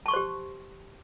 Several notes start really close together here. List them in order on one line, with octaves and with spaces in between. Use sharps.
A5 C#6 C6 C5 G4